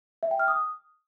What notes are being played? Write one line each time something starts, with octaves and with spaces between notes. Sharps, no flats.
E5
G5
F6
D#6